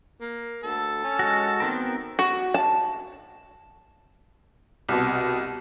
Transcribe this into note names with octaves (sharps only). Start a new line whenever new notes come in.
A#3
D2 A4
C#4
G#3 F#4
D#3 B3 C4 A#4
F#4
A5
C2 B2